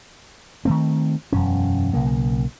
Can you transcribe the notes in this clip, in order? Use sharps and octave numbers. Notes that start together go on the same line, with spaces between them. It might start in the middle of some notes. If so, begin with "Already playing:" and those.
D#3 A3 C4
E1 F#2 C#4
B1 C#3 A#3